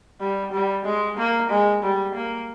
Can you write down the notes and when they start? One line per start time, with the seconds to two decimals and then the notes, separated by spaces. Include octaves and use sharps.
0.20 G3
0.52 G3
0.85 G#3
1.17 A#3
1.50 G#3
1.83 G3
2.15 A#3